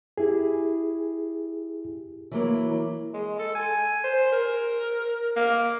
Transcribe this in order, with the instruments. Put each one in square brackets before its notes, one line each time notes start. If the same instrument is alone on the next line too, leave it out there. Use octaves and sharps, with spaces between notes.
[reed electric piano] E4 G4 G#4
[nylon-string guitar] E3 F#3 A#3
[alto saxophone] G#3
A4
G#5
C5
A#4
A#3